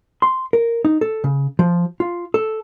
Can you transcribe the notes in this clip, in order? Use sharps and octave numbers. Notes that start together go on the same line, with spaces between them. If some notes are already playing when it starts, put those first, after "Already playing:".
C6
A#4
D#4
A4
C#3
F3
F4
A4